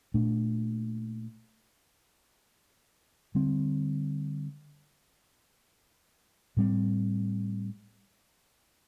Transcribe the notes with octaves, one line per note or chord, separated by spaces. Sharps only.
A#2 A3 D4
D3 G3 C4
A2 G3 C4